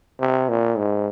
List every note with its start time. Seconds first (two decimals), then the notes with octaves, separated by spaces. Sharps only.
0.19 C3
0.49 A#2
0.77 G#2